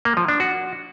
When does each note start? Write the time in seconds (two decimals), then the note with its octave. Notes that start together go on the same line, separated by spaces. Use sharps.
0.05 A#3
0.17 F3
0.28 D4
0.40 F#4